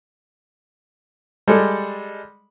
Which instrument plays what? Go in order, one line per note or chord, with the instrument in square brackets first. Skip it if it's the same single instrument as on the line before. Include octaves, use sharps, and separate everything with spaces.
[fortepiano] G3 G#3 A4